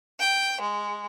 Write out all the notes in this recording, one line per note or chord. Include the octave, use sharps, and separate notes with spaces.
G5
G#3